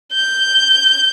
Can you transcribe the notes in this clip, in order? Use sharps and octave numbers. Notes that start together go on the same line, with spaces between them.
G6